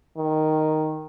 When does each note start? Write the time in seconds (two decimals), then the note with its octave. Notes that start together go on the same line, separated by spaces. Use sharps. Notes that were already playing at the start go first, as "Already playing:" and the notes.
0.17 D#3